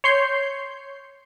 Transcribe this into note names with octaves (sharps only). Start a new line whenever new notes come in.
C#5 C6 G6 C7